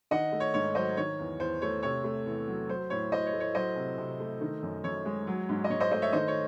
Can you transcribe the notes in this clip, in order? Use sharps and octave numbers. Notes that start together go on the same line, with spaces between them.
D#3 D#5 F#5
A3
C#5
G#2 C#5
F#3 C5 D#5
D#3 C#5
E2
E2 C5
A3 C#5
C3 C#5
A3
E2
F#3
F#3 C5
A2 C#5
A2 C5 D#5
C#5
A3
C#5
F#3 C5 D#5
C3
C3
A3
D#3
F#2
F#2 C#5
G#3
F#3
G#2
D#5
G#2 C#5
C5 D#5
A3 C5 D#5
C#5 E5
D#3 C5 D#5
C#5